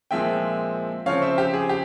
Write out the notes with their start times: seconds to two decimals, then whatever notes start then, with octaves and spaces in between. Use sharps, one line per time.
0.11 A#2 F3 G#3 C4 E5 G5
1.06 C#3 F3 C4 C#5 F5
1.22 C5 E5
1.38 G4
1.54 G#4
1.69 G4